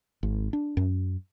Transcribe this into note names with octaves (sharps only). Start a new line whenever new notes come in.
G#1
D4
F#2